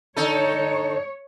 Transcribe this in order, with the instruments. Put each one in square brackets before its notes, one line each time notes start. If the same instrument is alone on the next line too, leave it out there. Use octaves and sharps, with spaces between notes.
[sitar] D3 D#4 A4 [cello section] C#5